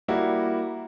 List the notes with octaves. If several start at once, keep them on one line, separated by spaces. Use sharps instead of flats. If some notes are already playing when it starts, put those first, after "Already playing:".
G3 A#3 E4 F#4